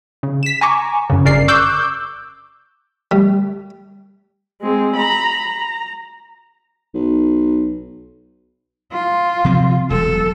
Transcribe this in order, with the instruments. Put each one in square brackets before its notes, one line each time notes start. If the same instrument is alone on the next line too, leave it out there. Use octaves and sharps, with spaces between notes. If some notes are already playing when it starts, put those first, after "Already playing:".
[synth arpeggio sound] C#3
B6 E7
G#5 A#5 C#6 D6
F#2 C#3
G1 C#3 A#4 D5 C7
C#6 D6 E6 F#6 G6
[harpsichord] G3
[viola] G#3 C4
A#5 B5
A#5
[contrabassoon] B1
[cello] F4
[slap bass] C3 F3 C4
[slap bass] E1 F#3 [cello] A4